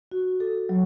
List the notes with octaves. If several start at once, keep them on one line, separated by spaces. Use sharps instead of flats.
F#4
A4
F#3